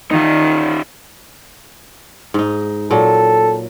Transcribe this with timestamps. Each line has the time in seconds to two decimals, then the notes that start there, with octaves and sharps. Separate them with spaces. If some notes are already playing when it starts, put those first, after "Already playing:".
0.11 D#3 D#4 F4
2.34 G#2 D#4
2.91 A#2 F#3 A4